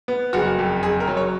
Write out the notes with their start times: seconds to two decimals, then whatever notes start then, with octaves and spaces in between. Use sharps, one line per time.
0.08 B3
0.33 F#1 F#4
0.59 F2
0.83 F#1 G#4
1.00 A#4
1.07 F#3
1.17 C#5